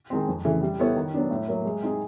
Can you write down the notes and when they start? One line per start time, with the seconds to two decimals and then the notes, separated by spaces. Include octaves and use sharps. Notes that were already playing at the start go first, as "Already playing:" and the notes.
0.10 D#3 G#3 C4
0.28 F2
0.45 C#3 E3 A3
0.62 G3
0.79 B3 E4 A4 C#5
0.96 D#3
1.14 F#3 B3 D4
1.31 A2
1.48 F#3 A#3
1.65 G#3
1.82 C4 D#4 G#4